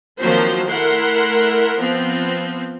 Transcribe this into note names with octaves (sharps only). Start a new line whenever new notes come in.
D#3 F3 F#3 A#3 C4 C5
A3 E4 A#4 F#5 C6
F3 B3 C4